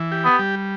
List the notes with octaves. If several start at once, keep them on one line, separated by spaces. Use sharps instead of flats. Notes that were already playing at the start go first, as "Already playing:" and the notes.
Already playing: E3
G4
B3
G3